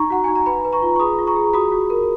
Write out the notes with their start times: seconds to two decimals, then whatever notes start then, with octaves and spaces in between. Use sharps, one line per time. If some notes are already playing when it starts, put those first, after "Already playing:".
Already playing: D#4 A#5 C#6
0.10 F#4 F#5
0.24 D#4 G#5
0.35 A#5
0.46 B4 G#5 B5
0.65 B4
0.73 A#5 C#6
0.82 F4
0.96 C#6
0.99 G#4 B5 D#6
1.19 F4
1.27 A#5 C#6
1.36 G#4
1.53 F#4 B5 D#6
1.72 F#4
1.90 A#4